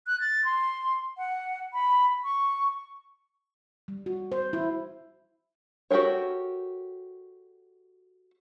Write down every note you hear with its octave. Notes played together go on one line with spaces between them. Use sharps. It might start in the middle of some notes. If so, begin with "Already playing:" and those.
F#6
A6
C6
F#5
B5
C#6
G3
F#4
C5
E4
F#4 G4 A4 A#4 C#5